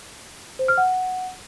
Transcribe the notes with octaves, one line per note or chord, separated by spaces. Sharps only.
C5
F6
F#5